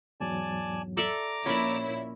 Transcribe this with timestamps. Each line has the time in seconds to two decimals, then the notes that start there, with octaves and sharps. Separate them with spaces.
0.21 E2 G#2 F#3 D5 G#5 A5
0.97 A4 D5 E5 A#5 D6
1.46 A#1 A#2 C#4 E4 A#4 C#5 D5 B5